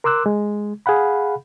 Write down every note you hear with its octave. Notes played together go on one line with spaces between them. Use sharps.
A#4 C6 D6 E6 F#6
G#3
G#4 F5 F#5 B5